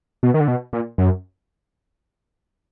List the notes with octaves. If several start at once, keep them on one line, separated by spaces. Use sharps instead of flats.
B2
D#3
D3
B2
A#2
F#2